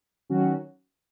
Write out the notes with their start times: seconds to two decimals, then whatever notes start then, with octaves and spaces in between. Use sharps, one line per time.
0.29 D#3 F#3 C#4 F#4